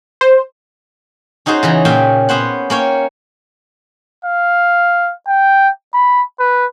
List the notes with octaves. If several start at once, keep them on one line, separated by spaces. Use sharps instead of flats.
C5
C#4 D#4 F#4 G#4 C5
C#3 E3 A#5
A#2 C#4 E5 F5 G5
B3 C#4 C5 F#5
A#3 C#4 C#5 G5
F5
G5
B5
B4